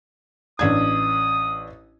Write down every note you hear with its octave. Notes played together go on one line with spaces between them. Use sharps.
A1 D4 D#6 G#6